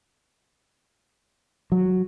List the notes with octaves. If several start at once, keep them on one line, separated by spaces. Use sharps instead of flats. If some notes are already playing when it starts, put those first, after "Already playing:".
F#3